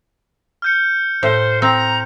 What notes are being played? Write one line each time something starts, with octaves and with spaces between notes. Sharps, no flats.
F6 G6 C#7
A2 C5
C4 A#5